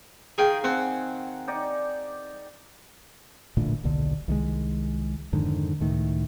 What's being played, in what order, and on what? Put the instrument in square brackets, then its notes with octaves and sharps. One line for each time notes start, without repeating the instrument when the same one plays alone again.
[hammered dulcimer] D#3 F5 [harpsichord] G#4 G5
[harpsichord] C4 [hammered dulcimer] G#4 F#5
[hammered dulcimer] D#4 D5 G5
[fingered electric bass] A1 A#2 D3 A3
D#1 B1 A#2 D3
C2 D#3 G3 G#3
F2 G#2 D3 D#3
C#2 A2 D#3